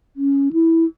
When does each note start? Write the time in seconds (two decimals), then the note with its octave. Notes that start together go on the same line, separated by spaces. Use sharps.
0.16 C#4
0.53 E4